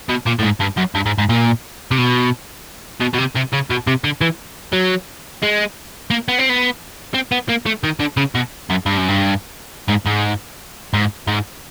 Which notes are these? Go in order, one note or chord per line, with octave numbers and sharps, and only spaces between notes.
B2
A#2
A2
G#2
G2
F#2
G2
G#2
G#2
A#2
C3
B2
B2
B2
C3
C3
C#3
B2
C3
D3
E3
F#3
G#3
A#3
B3
C4
B3
C4
B3
A#3
A3
D#3
D3
C#3
B2
F#2
G2
F#2
G2
G#2
G#2
G#2
G#2